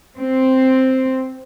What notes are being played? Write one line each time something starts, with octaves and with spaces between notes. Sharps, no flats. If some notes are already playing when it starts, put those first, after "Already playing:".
C4